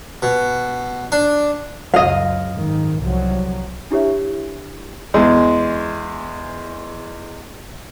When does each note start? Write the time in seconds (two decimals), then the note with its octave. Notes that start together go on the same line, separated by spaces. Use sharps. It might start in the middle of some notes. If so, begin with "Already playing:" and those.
0.22 B2
1.12 D4
1.94 C#2 F#2 D#5 F5
2.53 G#2 D#3
2.98 C2 F3 F#3
3.91 D4 E4 G4 C#5 E5
5.14 E2 G#3